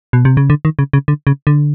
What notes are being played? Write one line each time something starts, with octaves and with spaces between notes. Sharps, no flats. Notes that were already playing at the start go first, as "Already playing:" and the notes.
B2
C3
C#3
D3
D#3
C#3
C#3
D3
C#3
D3